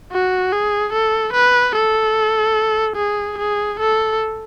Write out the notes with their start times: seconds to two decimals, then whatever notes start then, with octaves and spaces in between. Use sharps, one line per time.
0.12 F#4
0.52 G#4
0.93 A4
1.34 B4
1.75 A4
2.97 G#4
3.38 G#4
3.79 A4